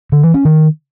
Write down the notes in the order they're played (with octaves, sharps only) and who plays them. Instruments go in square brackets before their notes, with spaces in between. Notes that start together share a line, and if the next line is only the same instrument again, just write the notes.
[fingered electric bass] D3
E3
C#4
D#3